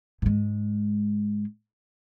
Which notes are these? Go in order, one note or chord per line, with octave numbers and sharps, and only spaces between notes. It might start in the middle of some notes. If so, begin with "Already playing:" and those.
G#2 G#3